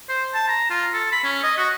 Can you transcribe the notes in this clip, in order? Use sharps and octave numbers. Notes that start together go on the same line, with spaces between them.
C5
A5
A#5
F4
A4
B5
C#4
D#5
F#4